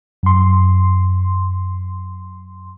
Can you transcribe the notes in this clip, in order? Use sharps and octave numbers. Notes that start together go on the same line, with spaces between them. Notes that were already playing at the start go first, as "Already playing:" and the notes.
F#2 C6